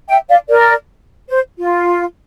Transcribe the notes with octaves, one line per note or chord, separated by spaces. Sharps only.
E5 G5
D5 F5
A#4 D5
C5
F4